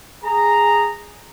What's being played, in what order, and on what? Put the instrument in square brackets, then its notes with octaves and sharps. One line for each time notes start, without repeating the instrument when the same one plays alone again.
[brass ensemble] G#4 A#5